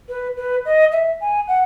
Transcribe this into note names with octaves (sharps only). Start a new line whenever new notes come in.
B4
B4
D#5
E5
G#5
F#5